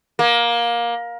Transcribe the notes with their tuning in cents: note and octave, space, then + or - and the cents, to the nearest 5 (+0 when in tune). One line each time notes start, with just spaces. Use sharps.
A#3 +20